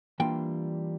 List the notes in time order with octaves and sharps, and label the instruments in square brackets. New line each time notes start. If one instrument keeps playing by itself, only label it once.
[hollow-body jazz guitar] E3 G3 A#3 D4 F4 G5